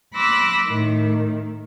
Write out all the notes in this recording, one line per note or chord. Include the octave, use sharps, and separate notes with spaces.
B5 C6 D6 E6 F#6 A#6
A2 D#3